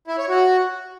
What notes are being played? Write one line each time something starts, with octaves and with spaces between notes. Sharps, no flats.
E4
C#5
F#4